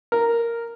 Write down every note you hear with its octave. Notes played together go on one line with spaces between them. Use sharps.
A#4